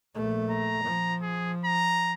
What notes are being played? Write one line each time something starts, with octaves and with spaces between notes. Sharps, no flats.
A#1 A3
A#5
F3
G#4
A#5